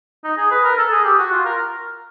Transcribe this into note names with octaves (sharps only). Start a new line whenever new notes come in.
D#4
G#4
B4
A#4
A4
G#4
G4
F#4
F4
A#4